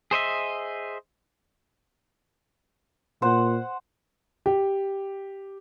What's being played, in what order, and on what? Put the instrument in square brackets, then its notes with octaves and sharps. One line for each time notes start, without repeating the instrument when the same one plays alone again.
[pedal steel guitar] G#4 C5 D#5 E5
[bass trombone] A#2 [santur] C5 F#5
[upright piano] G4